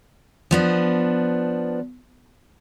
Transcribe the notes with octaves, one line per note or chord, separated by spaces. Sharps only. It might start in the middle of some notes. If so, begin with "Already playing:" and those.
F3 B3 D4